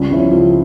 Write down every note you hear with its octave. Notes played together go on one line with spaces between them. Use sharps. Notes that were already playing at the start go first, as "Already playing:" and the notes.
Already playing: C#2 G3
C#3 F3 C#4 E4
C#2 F3